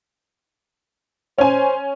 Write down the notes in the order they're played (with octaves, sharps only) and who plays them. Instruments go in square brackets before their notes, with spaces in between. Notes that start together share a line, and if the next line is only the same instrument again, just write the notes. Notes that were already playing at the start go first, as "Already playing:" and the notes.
[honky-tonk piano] C#4 G#5 [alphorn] C5